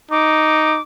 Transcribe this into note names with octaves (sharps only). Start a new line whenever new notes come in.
D#4 D6